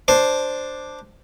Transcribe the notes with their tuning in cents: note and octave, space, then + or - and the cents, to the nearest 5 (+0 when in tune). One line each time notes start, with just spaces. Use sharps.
D4 +0 C5 +0